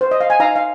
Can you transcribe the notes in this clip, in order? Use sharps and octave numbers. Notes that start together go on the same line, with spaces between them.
C5
D#5
F5
G#5
D#4 F5 A#5
F5